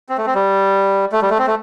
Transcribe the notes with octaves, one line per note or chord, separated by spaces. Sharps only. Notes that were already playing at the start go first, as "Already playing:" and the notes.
C4
A3
C4
G3
A3
G3
A3
C4
A3